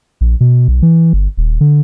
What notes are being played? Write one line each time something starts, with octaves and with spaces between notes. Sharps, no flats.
A#1
B2
B1
E3
G1
D#1
D3